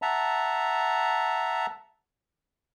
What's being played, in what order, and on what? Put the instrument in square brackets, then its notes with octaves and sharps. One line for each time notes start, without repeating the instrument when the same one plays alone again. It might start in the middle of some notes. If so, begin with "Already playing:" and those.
[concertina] E5 F#5 A5 A#5